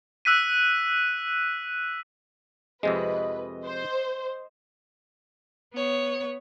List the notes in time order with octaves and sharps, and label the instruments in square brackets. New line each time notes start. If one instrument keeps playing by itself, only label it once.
[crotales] E6 F#6 B6 D#7
[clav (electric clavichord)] F2 C3 G#3 [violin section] B4 [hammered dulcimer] D#5
[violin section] C5
[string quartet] B3 C#5